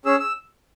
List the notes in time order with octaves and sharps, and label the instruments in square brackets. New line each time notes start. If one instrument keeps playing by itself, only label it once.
[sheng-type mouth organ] C#4 G#4 E6
E6